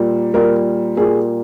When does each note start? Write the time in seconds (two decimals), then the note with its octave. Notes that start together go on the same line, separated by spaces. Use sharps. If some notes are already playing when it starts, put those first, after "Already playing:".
Already playing: A#2 G3 A#3
0.34 A#2 G3 A#3 A#4
0.97 A#2 G3 A#3 G#4